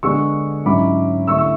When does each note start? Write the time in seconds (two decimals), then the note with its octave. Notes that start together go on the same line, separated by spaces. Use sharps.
0.03 D3 G#3 B3 D4 C#6 E6
0.65 G#2 F#3 C#4 E4 B5 D6
1.27 D3 A3 E4 C#6 E6
1.38 C#6 E6